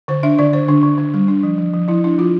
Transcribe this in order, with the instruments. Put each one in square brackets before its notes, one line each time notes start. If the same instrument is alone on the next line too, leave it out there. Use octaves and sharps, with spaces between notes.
[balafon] D3 C5
D4 E5
D3 D5
D3 C5
D3 D4
D3
D3
G3
D4
F3
F3
F3
F3 E4
D4 E4
F3 F4